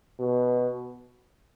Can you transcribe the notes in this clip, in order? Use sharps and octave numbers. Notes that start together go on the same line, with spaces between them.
B2